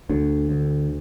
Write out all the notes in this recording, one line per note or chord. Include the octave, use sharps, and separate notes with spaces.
D2 D3
D2